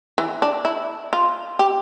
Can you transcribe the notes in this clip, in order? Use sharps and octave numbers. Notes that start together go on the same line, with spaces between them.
E3
D4
E4
F4
G4